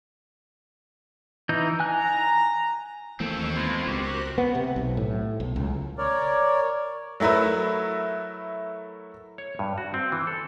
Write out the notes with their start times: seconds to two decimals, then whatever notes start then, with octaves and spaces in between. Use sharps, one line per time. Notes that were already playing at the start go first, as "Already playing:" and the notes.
1.49 E3 D#4 G6
1.80 G#5 A#5 F#6
3.20 D#2 E3 A3 A#3 C4 A4 C#6
3.56 G#3 B3 E4 F4
3.87 C#2 F#4 G4 A#4 C5 F#6
4.38 B3
4.55 C3
4.76 B1
4.97 A2
5.40 B1
5.56 C#2
5.98 A#4 C#5 D5
7.20 F#3 A3 E4 A#4 B4
9.38 C#5
9.59 G2
9.78 F#4
9.94 C4
10.12 E3
10.27 A4